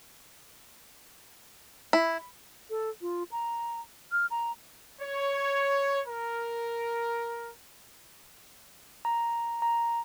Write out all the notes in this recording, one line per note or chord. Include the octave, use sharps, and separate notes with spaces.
E4
A4
F4
A#5
F6
A#5
C#5
A#4
A#5
A#5